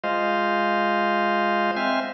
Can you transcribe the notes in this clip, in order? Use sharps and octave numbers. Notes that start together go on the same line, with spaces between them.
G#3 F4 C5 D#5 F5
C4 C5 E5 G#5 F6